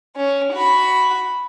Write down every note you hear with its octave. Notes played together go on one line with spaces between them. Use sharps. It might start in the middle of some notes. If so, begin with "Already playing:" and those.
C#4
F#4 B5